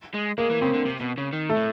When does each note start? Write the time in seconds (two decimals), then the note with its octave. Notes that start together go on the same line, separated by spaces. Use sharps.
0.14 G#3
0.38 G#3 A#3
0.50 E3
0.61 C#3 C4
0.74 D3
0.85 C3
1.01 B2
1.18 C#3
1.33 D#3
1.49 A3
1.56 A2